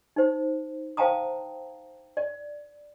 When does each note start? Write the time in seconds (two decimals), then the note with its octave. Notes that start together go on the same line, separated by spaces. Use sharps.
0.16 D#4 C5
0.97 C5 F5 G5 A5 A#5 D#6
2.17 D5